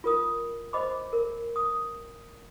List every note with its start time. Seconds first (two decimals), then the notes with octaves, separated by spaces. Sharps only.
0.04 F4 A#4 D#6
0.73 C5 D#5 B5 D6
1.13 A#4
1.56 D#6